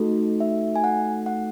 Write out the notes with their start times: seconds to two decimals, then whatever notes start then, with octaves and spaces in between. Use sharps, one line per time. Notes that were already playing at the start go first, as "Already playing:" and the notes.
Already playing: A3 D#4 F#4 A4
0.40 E5
0.76 G#5
0.84 F#5
1.26 F#5